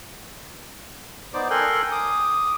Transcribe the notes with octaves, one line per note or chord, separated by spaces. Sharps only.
B3 D#4 C5 D5 D6
A4 A#4 G5 G#5 C6 F#6
D6 D#6